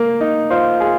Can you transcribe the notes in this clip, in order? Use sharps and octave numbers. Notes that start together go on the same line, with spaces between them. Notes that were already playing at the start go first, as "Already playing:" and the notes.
Already playing: A#3
D#4
F4 C5
G#4